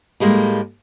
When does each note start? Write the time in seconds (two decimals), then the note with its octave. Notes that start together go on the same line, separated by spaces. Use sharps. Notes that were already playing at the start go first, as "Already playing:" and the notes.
0.20 A2 G3 G#3 A#3